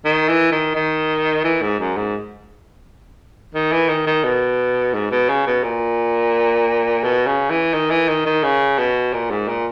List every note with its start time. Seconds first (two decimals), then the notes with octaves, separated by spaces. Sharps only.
0.05 D#3
0.28 E3
0.52 D#3
0.75 D#3
1.44 E3
1.62 G#2
1.80 F#2
1.97 G#2
3.55 D#3
3.72 E3
3.89 D#3
4.07 D#3
4.24 B2
4.94 G#2
5.11 B2
5.29 C#3
5.47 B2
5.64 A#2
7.04 B2
7.27 C#3
7.50 E3
7.73 D#3
7.91 E3
8.08 D#3
8.26 D#3
8.43 C#3
8.78 B2
9.13 A#2
9.31 G#2
9.48 A#2